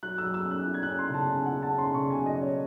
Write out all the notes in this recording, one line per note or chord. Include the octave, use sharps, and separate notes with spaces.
F#3 F#6
E6
F#3
E6
C#4
F#6
E4
G#6
C#4 F#6
C6
C#3
A5
C#4 G#5
F#5
E4
A5
C#4
C6
C#3 C#6
F#3 G#5
D#5
C#4
C#5